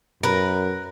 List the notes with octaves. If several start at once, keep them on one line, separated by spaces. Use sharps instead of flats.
F#2 A#4 B4